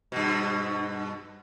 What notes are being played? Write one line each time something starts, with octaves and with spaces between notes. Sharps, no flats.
G2 B2